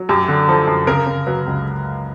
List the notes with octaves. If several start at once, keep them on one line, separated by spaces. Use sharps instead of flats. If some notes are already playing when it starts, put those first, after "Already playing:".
Already playing: F#3
F#2 G4
D3
F3 A4
F#2
C#3 A#4
C#3
F#3 B4
C#2